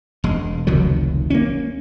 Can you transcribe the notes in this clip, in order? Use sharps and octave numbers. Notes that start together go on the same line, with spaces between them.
E1 G#3
F1 C#2 D#3 F#3
A#3 C#4